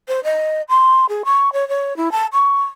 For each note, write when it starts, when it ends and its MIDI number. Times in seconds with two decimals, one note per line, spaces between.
0.08 0.20 72
0.24 0.62 75
0.69 1.06 84
1.09 1.23 68
1.25 1.53 85
1.53 1.68 73
1.68 1.96 73
1.97 2.12 64
2.12 2.26 81
2.33 2.62 85